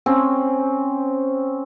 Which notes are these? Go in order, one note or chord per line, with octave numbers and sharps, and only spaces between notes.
C4 C#4